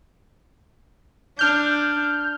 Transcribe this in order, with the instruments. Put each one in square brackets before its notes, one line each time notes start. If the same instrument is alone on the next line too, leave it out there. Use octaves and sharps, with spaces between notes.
[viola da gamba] D4 [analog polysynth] F6 G6